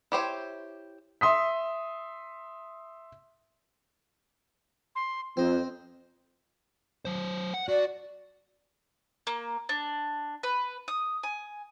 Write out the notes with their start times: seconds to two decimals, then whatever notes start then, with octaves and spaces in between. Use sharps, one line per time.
0.12 E4 G4 C5 C#5
1.21 E5 C6 D#6 B6
4.95 C6
5.37 F2 C4 C5 D#5
7.05 F#3 C5
7.54 F#5
7.69 F#4 D5
9.27 A#3
9.69 D4
10.43 B4
10.88 D#6
11.23 G#5